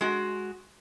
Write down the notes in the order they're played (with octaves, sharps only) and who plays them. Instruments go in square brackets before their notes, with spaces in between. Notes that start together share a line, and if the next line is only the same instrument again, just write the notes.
[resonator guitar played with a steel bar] G#3 F#4